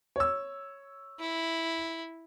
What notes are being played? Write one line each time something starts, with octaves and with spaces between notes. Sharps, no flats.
C#5 E6
E4